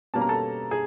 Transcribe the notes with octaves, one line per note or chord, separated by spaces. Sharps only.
B2 G3 A#3 C#4 A5
A#5
A4 A5
G#4 G#5